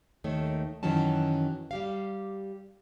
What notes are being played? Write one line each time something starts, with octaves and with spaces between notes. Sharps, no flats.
D#2 D#3 A3 C#5
F#2 D#3 E3 F#3 C#4 A5
G3 G4 F5